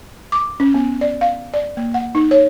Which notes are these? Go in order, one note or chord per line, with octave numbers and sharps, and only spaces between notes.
D6
C#4
B3
D5
F5
D5
A#3
F#5
D#4
C#5